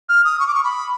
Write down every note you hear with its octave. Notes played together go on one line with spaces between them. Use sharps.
F6
D#6
C#6
D6
C#6
B5